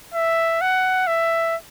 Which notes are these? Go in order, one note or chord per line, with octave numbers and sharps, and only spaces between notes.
E5
F#5
E5